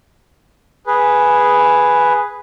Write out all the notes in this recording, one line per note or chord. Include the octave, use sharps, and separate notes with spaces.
G#4 B4